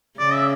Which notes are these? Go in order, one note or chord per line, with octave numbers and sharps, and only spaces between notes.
C#3 D5
E5